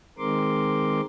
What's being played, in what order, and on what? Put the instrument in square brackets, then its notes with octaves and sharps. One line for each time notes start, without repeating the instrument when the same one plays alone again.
[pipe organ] D#3 G#3 C4 A#4 C6 D6